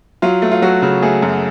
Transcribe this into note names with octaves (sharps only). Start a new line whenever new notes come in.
F#3 F4
A3
F4
F#3 F#4
C#3
A3 G#4
F#2